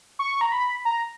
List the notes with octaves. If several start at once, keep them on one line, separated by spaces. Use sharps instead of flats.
C#6
A#5
B5
A#5